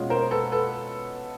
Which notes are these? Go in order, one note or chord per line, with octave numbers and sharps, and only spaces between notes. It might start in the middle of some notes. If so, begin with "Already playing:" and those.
Already playing: B2 G#3 C#4 F4
A#4 C5
A4 B4
A4 B4